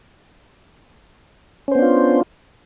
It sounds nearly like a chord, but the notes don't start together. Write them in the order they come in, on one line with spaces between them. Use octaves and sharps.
C#4 C5 B3 D4 F4